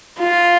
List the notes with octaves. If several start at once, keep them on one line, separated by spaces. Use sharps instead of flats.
F4